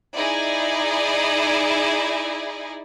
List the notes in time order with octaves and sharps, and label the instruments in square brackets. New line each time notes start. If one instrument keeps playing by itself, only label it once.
[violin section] D#4 E4 G#4 D5